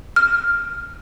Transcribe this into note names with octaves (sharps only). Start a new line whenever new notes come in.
F6